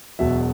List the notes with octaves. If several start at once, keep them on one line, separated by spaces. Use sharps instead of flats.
E1 E2 B2 F#3 E5